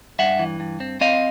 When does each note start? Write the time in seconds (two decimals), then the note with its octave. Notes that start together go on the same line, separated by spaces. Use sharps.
0.19 G2 E5 F#5
0.39 E3
0.60 G2
0.80 C4
1.01 C4 D#5 F5